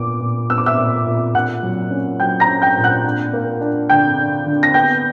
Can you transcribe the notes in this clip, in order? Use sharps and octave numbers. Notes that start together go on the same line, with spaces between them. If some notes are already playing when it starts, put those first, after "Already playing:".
Already playing: A#2 B3 D6
A#2
B3 E6
D6
E5 E6
A#2
A#2
A#2 F#5 F#6
F#3
C#4
F#3 G5 G6
A#5 A#6
C#4
G5 G6
A#2
F#5 F#6
D4
A#3
D4
D3 G5 G6
D4
D3
A#6
B3 G5 G6